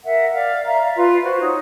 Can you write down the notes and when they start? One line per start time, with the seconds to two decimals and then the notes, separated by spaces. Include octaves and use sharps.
0.04 A#4 E5 F#5
0.34 D5 F5
0.65 D5 E5 F5 A#5
0.96 F4 B4
1.23 F#4 C5
1.40 D#4 C#5